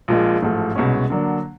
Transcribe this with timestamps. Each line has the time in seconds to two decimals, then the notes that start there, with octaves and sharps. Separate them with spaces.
0.08 A#1 A#2 F3 G#3
0.42 A1 G#2 F3 A3
0.75 C2 B2 G#3 C#4
1.10 D3 F#3 A#3 D4